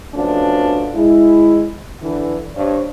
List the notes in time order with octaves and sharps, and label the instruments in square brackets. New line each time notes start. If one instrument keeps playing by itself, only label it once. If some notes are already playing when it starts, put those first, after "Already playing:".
[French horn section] F3 A3 B3 C#4 D4 F#4
G#3 E4
D3 E3
G2 D4 C5 C#5